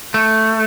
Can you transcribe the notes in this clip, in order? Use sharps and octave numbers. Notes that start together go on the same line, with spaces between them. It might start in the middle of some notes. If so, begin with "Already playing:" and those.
A3